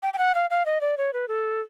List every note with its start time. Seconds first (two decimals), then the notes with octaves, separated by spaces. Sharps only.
0.03 G5
0.14 G5
0.18 F#5
0.35 F5
0.50 F5
0.66 D#5
0.81 D5
0.98 C#5
1.13 B4
1.28 A4